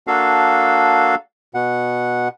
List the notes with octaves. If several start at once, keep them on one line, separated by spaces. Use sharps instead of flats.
A#3 D4 F#4 A4 F5
B2 F#5